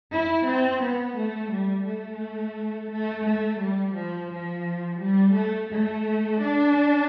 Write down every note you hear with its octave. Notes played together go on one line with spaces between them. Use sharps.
E4
C4
B3
A3
G3
A3
A3
A3
G3
F3
F3
G3
A3
A3
D4